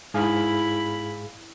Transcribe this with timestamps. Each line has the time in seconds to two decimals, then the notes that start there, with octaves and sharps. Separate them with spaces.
0.14 G#2 E4 G#4 F5 B5